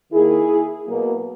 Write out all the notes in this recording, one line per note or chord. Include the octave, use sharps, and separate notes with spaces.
D#3 A#3 E4 G#4
B2 F#3 A#3